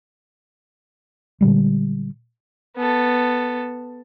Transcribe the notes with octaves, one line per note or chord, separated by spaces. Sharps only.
A#2 D3 G3 G#3
B3 A4